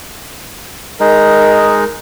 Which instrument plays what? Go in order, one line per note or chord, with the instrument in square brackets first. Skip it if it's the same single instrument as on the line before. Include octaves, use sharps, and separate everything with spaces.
[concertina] G#3 D#4 [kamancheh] A#4